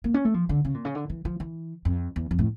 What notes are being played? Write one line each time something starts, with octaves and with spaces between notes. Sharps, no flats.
A#3
C#4
A3
F3
D3
C#3
A#2
C#3
D3
E3
F3
E3
F2
E2
F2
A2